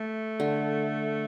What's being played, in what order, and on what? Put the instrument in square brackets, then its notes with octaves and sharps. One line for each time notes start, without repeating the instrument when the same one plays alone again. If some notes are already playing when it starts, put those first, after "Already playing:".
Already playing: [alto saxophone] A3
[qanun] D3